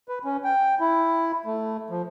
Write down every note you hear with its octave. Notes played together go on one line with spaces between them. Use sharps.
B4
C#4
G5
E4
A3
F3